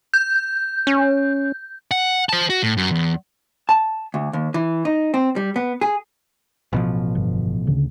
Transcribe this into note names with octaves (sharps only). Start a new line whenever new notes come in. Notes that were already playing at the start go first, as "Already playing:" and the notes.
G6
C#4
F#5
C5 A5
F#4
A2
F#2
E2
A5
D2
D#2
E3
D#4
C4
G3
B3
G#4
A1 B2 F3
G1
D2 C#3